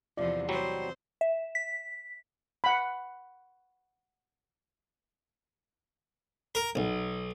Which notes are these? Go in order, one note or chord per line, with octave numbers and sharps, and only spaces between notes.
E2 C3 F3 D5
F#3 G3 C4 C5
E5
B6
F#5 B5
A#4
B1